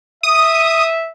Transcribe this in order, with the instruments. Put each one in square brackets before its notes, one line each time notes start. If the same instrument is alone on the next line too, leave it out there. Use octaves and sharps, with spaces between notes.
[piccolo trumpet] E5 [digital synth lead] D#6